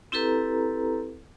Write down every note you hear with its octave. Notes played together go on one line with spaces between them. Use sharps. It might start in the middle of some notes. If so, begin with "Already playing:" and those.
C4 E4 G4 A4 B4 A#5